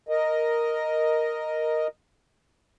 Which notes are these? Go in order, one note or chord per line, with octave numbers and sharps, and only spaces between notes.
A#4 D#5